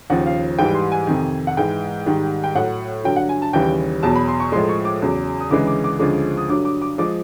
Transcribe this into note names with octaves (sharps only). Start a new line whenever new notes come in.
D#2 C#3 F3 F#5
F5
G#2 E3 G3 G5
C6
G#5
F2 C3 D#3
F#5
G#2 E3 G#3 G5
G#2 D#3 G3
G5
A2 F#3 F#5
G2 D3 F#3 G5
F#5
G#5
A5
D#2 C#3 E3 G3 G5
E2 B2 F#3 A5
B5
C6
C#6
A2 F3 G#3 C6
C#6
D6
E2 C#3 F#3
D#6
D2 C#3 E3 G#3 D6
D6
D6
D2 C#3 F3 G#3 D6
D#6
G2 D3 F#3 D6
D6
D6
F3 G#3 D6